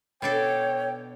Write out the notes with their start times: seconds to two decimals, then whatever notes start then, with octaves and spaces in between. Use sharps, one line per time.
0.22 B2 D4 A4 C#5 G5